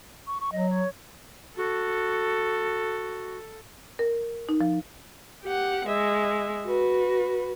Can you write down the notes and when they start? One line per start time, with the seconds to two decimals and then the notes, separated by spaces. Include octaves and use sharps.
0.27 C#6
0.41 C#6
0.52 F#3 D#5
0.70 C#5
1.57 F#4 A4
3.99 A#4
4.49 D#4
4.61 F3
5.44 G4 F#5
5.87 G#3 E5
6.66 F#4 B4